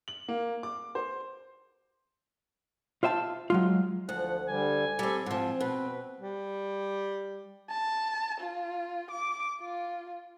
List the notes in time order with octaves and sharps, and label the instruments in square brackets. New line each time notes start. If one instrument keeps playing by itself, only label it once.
[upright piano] F#7
A#3
D6
C5
[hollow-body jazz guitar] F4 C5 E5 G#5 A5
F#3 G#3 F4
[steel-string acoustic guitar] D2 [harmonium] F3 [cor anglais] F#5
[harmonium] D3 G3 [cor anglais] G#5
[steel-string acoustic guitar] G3 C4 [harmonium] G4 A4
[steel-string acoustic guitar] G#2 F3 [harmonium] C4
[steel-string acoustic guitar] B2 [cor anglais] B4
[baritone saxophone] G3
[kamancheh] A5
F4
D6
F4